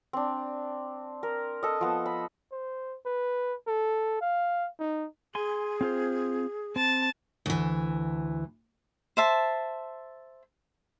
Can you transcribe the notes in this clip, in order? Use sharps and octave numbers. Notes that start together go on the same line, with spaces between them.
C4 D4
A#4
A4 D#5
F3 B3
B5
C5
B4
A4
F5
D#4
G#4 G#5 C6
C4 F4 C5
C4 A5
D2 E3
C5 E5 A5